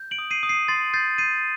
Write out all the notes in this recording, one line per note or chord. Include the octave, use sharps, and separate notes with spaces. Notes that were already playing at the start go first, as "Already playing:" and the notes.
Already playing: G6
D7 F#7
D#6
C7 D#7
D#6
C7 D#7
C6 A6 C7
G6 A6 C7
G6 C7 D#7